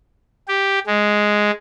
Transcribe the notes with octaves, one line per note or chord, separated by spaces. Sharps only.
G4
G#3